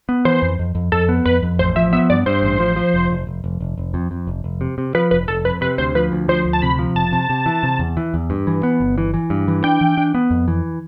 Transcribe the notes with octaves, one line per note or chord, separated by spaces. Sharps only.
B3
E3 C5
F2
F2
F2
F2 A4
B3
F2 B4
F2
A1 C5
F3 E5
B3 E5
G2 D5
G2 C5
A1
F3
F3
F1
F1
F1
F1
F1
F1
F2
F2
F1
F1
C3
C3
F3 B4
F1 B4
F1 A4
F2 B4
C3 B4
D2 C5
F3 B4
D2
F3 C5
D2
A5
C3 B5
F3
F1 A5
C3
C3
E3
C3
E2
E3
E2
G2
E3
B3
G1
E3
E3
G2
E3
D4 G5
E3
D4
B3
F2
E3